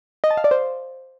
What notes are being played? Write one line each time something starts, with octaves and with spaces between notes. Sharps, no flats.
D#5
A5
F5
D5
C5